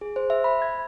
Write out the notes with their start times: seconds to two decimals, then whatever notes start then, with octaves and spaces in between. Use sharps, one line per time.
0.01 G#4
0.16 C5
0.30 E5
0.44 B5
0.62 G#6